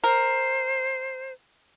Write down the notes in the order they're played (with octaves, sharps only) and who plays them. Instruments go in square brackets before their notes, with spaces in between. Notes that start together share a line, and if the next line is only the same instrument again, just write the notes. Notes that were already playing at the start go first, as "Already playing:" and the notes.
[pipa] A#4 [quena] C5